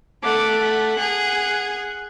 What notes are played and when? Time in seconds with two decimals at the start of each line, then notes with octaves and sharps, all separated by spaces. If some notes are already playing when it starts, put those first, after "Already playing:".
0.23 A3 F#5 D6
0.61 F#5
0.99 G#4